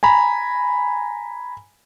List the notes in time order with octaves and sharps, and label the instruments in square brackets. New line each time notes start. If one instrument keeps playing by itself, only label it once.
[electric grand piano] G#5 A#5 B5